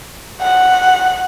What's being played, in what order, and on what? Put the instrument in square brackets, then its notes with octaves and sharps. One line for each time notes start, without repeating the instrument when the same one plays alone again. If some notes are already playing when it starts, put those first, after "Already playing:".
[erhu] F#5